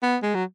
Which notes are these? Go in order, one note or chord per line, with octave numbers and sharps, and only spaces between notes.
B3
G#3
F#3